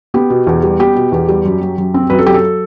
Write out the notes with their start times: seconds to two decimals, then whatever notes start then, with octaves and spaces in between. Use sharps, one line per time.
0.14 B3 G4
0.30 B2
0.47 E2
0.63 G3
0.79 B3 G4
0.95 B2
1.12 E2
1.28 G3
1.45 F#2
1.61 F#3
1.78 F#2
1.94 C4
2.10 F#2 B4
2.19 A4
2.26 F#3 G4
2.34 A4